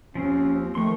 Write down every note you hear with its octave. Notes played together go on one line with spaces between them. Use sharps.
D#2 F3 C4 C#4
D#3 F3 A3 C6 C#6